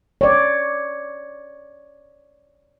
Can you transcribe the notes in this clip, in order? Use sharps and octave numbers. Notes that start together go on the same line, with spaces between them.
C#5 D5